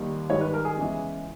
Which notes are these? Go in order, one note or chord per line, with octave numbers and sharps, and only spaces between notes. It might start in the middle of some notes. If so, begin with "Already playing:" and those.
Already playing: D#2 D#3 G3
G#2 D#3 G3 C#5
B4
A#4
G#4
E2 C#3 E3 G#3